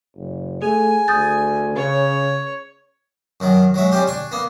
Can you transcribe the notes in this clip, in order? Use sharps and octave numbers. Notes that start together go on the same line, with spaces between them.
F#1
A3 G#4 G#5
D2 D#6 G6 A6
C#3 C#5
F#2 D#3 F#3
F#3 G#3 E5
G3 C4 C#4 G4
D4 G#5 C#6
A#3 B3